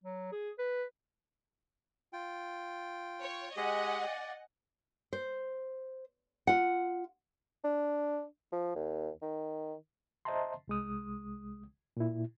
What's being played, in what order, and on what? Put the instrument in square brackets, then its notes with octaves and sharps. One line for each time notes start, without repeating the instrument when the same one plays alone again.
[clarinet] F#3
G#4
B4
[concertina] F4 G5
[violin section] C#5
[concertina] G#3 G4 G#4 [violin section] D#5 F#5 G#5
[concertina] D5
[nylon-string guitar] C5
F4 F#5
[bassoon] D4
F3
D#2
D#3
[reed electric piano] C5 D#5 E5 A5 A#5 C6
C2 G#3 D#6
A#2 E4